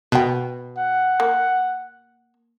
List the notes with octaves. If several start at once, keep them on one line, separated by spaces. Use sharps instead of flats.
B2 B4 G5
F#5
A#3